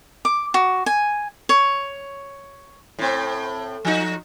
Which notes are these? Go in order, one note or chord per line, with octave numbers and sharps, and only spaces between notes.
D6
F#4
G#5
C#5
A2 C4
F3 D#4 F#4